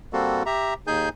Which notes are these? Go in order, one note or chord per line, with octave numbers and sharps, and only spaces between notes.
G3 A#3 C4 F#4 A4
G4 E5 A#5
D#2 D#4 G#4 G#5 G6